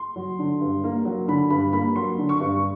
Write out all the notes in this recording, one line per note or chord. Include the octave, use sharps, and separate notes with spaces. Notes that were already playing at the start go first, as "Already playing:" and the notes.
Already playing: C6
F#3
D3
G2
A#3
F#3
D3 B5
G2 B5
A#3 B5
F#3 C6
D3
C#6
G2